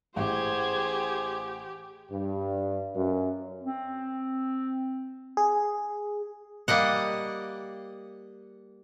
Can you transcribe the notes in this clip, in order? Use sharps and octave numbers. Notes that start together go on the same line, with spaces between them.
A1 G4 G#4 C5 G#6
G2
F#2
C4
G#4
G3 A#3 D#5 F#5